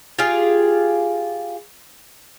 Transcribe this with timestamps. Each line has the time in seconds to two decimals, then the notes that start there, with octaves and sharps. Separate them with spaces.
0.19 F4 G4 G#4 F5